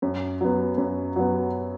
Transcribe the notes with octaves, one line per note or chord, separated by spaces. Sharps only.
F#2
F#3 B3
F#2
F#3 B3